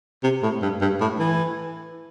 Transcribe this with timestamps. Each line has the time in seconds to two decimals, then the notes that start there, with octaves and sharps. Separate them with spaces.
0.23 C3
0.43 A2
0.62 G2
0.81 G2
1.01 A2
1.20 E3